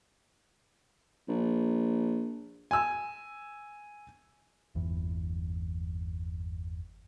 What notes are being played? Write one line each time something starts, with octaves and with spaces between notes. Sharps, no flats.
A#1
G#5 E6
G1 E2 E3